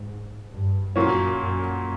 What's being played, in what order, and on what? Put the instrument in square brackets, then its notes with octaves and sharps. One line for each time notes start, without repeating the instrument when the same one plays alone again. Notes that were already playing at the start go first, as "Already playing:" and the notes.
Already playing: [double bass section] G#2
G2
[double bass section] F#2 [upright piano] A#2 F#3 A#3 C#4
[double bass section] F#2